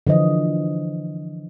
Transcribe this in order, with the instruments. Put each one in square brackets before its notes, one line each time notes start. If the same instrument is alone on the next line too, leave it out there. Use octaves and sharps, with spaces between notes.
[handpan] D3 E3 F3 D#5